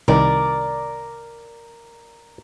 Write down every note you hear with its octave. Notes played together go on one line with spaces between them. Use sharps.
C2 D#3 A#4 D5 A#5